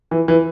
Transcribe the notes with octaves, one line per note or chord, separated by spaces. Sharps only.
E3
E3